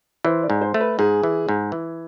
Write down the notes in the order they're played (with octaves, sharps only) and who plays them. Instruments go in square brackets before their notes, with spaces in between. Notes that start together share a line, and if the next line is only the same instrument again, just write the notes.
[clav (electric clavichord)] E3 [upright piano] C5
[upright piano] D5
[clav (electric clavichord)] G#2
[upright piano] C5
[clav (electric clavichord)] A3
[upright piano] B4
[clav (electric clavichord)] G#2 [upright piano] G#4
[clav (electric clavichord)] E3
G#2
E3